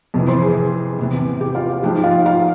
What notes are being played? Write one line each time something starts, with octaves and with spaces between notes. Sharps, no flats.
F2 C3 E3
C5 C6
G#4 G#5
E2 C3 E3
G4 G5
F4 F5
G#2 F3 G4 G5
F4 F5
F4 F5